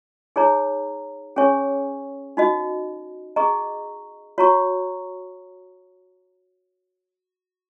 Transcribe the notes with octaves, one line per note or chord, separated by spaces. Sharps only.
D#4 G#4 C#5 A#5
C#4 G#4 C#5 G#5 C#6
D#4 F#4 D#5
G#4 D#5 A#5 C#6
F#4 C#5 A#5 C#6